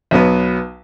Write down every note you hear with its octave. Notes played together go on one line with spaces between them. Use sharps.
B1 F#3 B3 B4